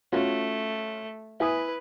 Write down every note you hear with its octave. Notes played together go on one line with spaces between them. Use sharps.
A3 C#4 F4 F#4
E4 B4 G#5 D#6